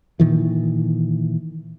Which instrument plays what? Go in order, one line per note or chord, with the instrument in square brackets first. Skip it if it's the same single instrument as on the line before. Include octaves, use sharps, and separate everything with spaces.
[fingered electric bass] A#2 D#3 E3